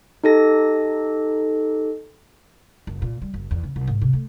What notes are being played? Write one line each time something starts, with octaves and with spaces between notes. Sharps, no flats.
D#4 G4 A4 A#6
F#1
A#2
G3
F#1
E2
C#3
C2
G#2
C3
A3